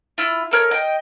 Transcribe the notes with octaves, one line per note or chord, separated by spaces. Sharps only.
E4 F4
A4 A#4 C#5
D#5 G5